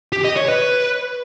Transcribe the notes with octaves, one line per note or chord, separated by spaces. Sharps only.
G4
D#5
C#5
B4